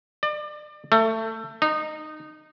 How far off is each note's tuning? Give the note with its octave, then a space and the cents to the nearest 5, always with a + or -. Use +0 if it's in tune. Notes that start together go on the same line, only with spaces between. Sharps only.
D5 +30
A3 +25
D#4 -20